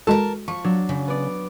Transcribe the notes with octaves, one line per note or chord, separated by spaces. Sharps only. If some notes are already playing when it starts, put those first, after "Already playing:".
G#3 F#4 A4 A#4 A5
F3 C#6
F#3 D4
C#3
B3 D5